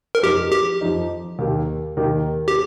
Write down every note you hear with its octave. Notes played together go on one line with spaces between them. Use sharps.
A#4
F2 F3 D#4 G4
G4
F2 F3 D#4
D#2 D#3 A#3 G4
D#2 D#3 A#3 G4
G4